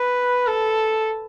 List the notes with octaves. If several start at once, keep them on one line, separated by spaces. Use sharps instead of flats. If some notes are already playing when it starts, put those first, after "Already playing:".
Already playing: B4
A4